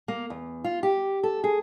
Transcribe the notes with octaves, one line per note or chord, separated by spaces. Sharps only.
A#3
E2
F4
G4
A4
G#4